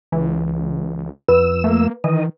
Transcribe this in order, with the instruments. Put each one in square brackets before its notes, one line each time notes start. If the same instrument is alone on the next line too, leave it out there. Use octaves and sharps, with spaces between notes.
[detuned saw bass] C#2 [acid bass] E3
[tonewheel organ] F2 E6 [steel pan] B4
[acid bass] A3 [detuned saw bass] A#3
[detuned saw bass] D#3 [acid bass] E3 [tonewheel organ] D#5